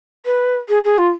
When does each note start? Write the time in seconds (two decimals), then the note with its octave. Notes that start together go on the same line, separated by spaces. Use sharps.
0.25 B4
0.68 G#4
0.84 G#4
0.98 F4